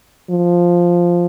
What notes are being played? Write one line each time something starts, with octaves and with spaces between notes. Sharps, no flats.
F3